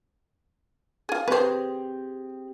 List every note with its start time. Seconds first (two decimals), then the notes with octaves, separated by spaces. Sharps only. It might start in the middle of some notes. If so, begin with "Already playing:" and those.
1.09 F4 G#4
1.28 C4 G4 G#4 B4 C5